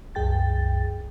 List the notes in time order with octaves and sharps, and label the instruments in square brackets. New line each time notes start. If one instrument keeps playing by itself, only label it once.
[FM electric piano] C2 F#2 G#4 G5 A6